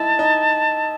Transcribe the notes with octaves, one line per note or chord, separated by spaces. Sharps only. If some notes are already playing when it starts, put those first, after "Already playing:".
Already playing: D#4 E4 A5
D#4